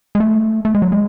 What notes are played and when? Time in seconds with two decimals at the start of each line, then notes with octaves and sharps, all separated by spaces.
0.15 G#3
0.20 A3
0.65 A3
0.75 G#3
0.82 F#3
0.92 G#3